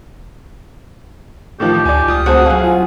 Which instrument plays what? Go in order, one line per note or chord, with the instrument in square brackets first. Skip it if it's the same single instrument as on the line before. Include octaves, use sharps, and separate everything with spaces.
[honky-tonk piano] A2 D#3 F3 [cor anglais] G4
[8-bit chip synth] D2 [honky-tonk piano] D5 G#5
[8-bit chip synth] C#2 D#6 [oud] F4
[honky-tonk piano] D2 C4 A5 [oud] F#4 C5 F5 [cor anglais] G#4
[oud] F#3 E4 [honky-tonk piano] F5 G#5
[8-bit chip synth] F4